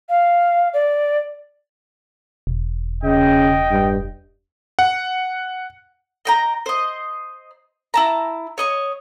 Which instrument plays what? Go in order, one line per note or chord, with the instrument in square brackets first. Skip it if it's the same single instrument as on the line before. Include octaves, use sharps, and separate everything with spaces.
[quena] F5
D5
[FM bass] E1
[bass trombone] C#3 [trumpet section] D#5 G5
[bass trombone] G2
[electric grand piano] F#5
[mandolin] D#5 G5 A#5
C5 D#5
E4 A5 A#5
C#5 D#5 C#6